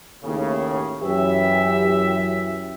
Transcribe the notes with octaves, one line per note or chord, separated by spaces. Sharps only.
D#2 A2 C#3
F#2 E3 G4 E5